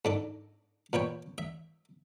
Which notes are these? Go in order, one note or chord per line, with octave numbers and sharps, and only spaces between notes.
G#2 D4 A4
A#2 B4 C#5 G5
E5